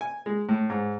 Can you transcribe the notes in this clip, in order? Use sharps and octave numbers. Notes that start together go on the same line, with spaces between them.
G#5
G#3
A2
G#2